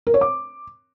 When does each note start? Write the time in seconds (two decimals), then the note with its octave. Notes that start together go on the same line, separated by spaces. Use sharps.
0.07 A#4
0.14 C#5
0.21 D6